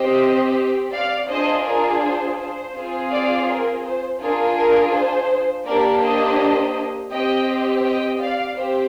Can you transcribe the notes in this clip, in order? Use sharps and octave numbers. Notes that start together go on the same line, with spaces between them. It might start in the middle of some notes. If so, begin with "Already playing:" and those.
Already playing: C4 G4 C5 D#5
D5 F5
D4 F4 G#4 C5 D#5
A#4 D5
C5
C5
C4 F4 G#4
D5 F5
A#4
C5
D4 F4 G#4 A#4
A#4
C5
A#3 D4 G4 A#4 D5
C5 D#5
C4 G4 D#5 G5
D#5 G5
D5 F5
C4 G4 C5